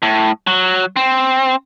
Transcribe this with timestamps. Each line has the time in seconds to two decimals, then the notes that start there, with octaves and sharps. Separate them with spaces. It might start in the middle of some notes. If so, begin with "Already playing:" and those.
0.03 A2
0.47 F#3
0.96 C4